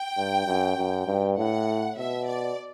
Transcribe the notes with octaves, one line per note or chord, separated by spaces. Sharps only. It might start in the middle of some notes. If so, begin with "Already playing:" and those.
Already playing: G5
G2
F#2
F#2
G2
A2 F#5
B2 E5
D5